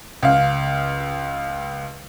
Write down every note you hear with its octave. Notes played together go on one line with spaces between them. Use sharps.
C#2 F5